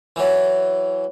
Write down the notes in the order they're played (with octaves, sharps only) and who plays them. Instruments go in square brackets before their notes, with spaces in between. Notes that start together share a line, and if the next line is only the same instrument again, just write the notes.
[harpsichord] E3 F#3